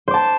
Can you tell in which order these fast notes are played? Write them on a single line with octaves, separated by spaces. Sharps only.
C5 D6 A5